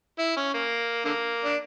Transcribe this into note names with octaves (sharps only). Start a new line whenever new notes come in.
E4
C#4
A#3
D3 A#3
D4